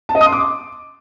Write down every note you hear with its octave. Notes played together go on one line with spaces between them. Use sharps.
A5
D#5
D#6
C6
D6